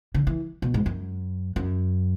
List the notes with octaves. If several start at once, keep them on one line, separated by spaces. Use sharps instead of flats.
D3
E3
B2
G#2
F#2
F#2